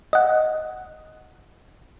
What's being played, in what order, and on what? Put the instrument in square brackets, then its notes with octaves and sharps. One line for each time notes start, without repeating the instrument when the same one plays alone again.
[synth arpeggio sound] D#5 F#5